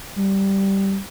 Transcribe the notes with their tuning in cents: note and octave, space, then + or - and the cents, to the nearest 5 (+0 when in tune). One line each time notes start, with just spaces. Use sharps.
G3 -10